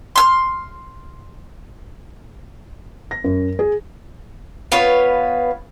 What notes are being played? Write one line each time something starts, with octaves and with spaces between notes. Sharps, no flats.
C6 E6 F6
A#6
F#2
G#4
B3 F4 B4 C#5